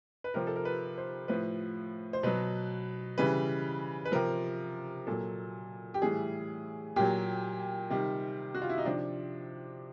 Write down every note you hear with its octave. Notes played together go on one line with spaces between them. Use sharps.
B4
C3 F3 A#4
A4
A#4
B4
C5
A2 F3 B4
C5
B2 F#3 B4
C#3 E3 G3 B4
B4
C3 F3 A#4
A#2 F#3 A4
G4
A2 E3 G3 G#4
A#2 F#3 G4
C3 D#3 G3
F#4
F4
E4
D#4
C3 F3 D4